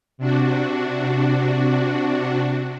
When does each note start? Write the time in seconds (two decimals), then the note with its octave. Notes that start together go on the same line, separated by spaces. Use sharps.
0.18 C3 D4 F#4